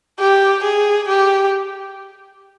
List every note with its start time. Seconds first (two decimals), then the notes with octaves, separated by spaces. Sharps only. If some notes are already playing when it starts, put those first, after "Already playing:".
0.20 G4
0.64 G#4
1.08 G4